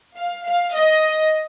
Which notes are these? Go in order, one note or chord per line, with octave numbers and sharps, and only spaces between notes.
F5
F5
D#5